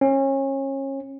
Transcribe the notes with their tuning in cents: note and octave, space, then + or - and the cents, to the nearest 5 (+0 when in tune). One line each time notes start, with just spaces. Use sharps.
C#4 -30